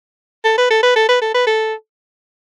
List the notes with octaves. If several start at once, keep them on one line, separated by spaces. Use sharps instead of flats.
A4
B4
A4
B4
A4
B4
A4
B4
A4